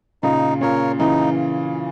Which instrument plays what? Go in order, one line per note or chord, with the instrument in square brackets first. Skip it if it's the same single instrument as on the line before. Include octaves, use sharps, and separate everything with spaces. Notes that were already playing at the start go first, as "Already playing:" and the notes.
[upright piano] A#2 C#3 [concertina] D#4
[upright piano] A#2 C#3 [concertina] A#4 C#5
[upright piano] C#3 E3 [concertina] D#4